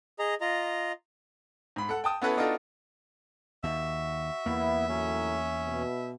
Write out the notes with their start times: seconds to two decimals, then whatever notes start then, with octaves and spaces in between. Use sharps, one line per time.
0.19 G#4 D#5 A#5
0.41 F4 D#5 A#5
1.76 G#2 B5
1.89 A4 F#5
2.04 G5 A5 D#6
2.22 B3 C#4 E4 F#4 A4 B4
2.37 B3 D4 D#4 F4 F#4 A4
3.64 D#2 F#4 E5
4.46 E2 A#3 B3 E4
4.88 A2 F#3 C#4
5.66 B2